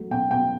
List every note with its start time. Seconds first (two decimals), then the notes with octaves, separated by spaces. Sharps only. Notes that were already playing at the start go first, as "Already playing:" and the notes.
Already playing: F#3 A3
0.11 B2 G5
0.31 B2 G5